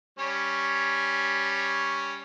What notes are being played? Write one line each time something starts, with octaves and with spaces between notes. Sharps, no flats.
G3 C#4 C#5